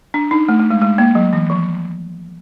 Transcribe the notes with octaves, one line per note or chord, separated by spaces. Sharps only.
D4
D#4
A3
A3
G#3
G#3
A#3
F#3
E3
F3